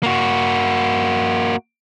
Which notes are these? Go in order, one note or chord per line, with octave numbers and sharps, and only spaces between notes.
A#3 F#4